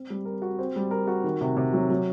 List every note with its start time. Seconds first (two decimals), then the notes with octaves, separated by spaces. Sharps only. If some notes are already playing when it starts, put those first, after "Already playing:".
Already playing: C4
0.10 G3
0.25 A#4
0.42 F#4
0.59 C4
0.76 G3
0.91 A#4
1.07 F#4
1.24 D#3
1.41 C3
1.57 C3
1.73 F#3
1.90 F#3